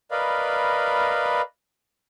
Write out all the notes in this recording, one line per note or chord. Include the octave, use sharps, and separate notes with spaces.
A#4 B4 D5 D#5 F5 B5